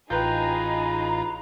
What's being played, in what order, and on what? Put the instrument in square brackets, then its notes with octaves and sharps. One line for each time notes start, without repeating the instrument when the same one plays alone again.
[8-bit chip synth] A1 F4 [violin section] D#4 G#4 [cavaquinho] B4 G5 [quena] A#5